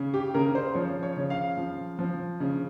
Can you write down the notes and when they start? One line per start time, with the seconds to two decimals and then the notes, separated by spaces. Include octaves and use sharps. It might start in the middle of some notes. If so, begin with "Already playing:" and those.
Already playing: C#3
0.14 G4
0.34 C#3 A#4
0.55 C5
0.75 F3 C#5
1.03 C#5
1.17 C#3
1.30 F5
1.57 F3
1.99 F3
2.40 C#3